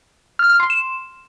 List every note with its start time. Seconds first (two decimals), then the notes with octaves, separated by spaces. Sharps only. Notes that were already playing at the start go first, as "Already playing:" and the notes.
0.39 F6
0.50 F6
0.60 C6
0.70 E7